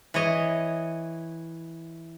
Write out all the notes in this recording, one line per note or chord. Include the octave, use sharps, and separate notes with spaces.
E3 C#5 D#5